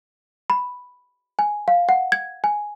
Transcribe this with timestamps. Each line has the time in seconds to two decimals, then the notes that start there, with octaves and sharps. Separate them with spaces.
0.50 B5
1.39 G#5
1.68 F5
1.89 F#5
2.12 G#6
2.44 G#5